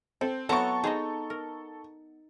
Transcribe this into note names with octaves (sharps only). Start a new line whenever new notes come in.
C4 A4
F#3 B3 C4 E4 A4 A5 A#5 C#6
D#4 G#4 C5 D#5
A#4